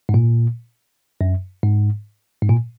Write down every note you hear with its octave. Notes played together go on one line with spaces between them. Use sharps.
G#2
A#2
F#2
G#2
G#2
A#2